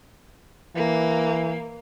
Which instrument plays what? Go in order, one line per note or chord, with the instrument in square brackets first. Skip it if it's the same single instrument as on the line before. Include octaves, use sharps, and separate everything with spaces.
[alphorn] E3 [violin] A#3